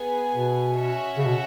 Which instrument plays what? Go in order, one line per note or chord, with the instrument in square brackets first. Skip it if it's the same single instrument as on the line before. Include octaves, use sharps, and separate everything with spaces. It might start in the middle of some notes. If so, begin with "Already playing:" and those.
Already playing: [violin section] B3 G#4 B4 G#5
[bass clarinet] B2
[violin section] C#4 F#4 C#5 E5
[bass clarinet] C#3
B2